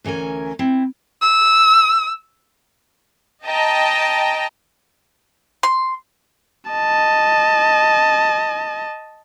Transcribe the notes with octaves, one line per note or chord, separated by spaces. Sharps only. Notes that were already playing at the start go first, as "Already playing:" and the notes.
D2 E3 C#4 A#4 G#5
C4 E4
E6
D#5 G5 A5 A#5
C6
D#5 A5